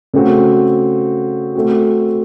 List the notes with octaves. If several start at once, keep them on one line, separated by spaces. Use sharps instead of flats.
C#3 A3 C4 F#4
A3 C4 F#4